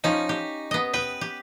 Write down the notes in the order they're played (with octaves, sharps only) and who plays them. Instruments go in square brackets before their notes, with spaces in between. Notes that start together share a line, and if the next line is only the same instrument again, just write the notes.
[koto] F3 C#4 [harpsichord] D#4
[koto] G4
B3 D#5
[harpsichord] B4 [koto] G5
[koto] G4